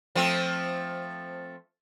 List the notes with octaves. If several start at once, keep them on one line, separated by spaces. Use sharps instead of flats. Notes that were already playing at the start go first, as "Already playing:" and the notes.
F3 A3 C4